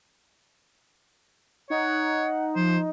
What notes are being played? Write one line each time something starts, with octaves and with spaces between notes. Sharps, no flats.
D#4 C#5 F#5
F3 C5